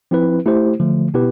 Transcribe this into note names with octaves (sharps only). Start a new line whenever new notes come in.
F3 C4 E4 B4
A3 E4 G4 C5
D3 F3 A3
B2 B3 E4 G4 B4